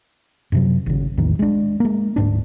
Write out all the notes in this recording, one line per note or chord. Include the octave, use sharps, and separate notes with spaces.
F#2 C3 F#3
G#1 C#3
A#1 E2 A2 D#3
G#3 D4
G#3 A#3
D1 G#2 D4